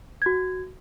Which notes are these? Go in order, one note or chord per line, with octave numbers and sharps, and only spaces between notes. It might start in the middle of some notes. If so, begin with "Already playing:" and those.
F#4 G#6